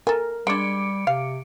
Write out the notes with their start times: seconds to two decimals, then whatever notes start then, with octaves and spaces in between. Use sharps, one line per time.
0.07 A4 A#4 G#5
0.47 G3 G#3 D4 D6 C#7 D7
1.07 C3 F5